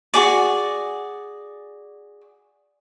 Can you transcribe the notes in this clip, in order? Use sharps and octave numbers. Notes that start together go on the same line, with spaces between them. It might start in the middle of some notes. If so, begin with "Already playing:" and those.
F#4 G#4 D5